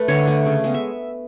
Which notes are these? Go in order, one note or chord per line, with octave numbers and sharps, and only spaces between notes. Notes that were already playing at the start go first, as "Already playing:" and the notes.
Already playing: A3 B4
D3 C#5
A3
C#3
G#3 B3
E5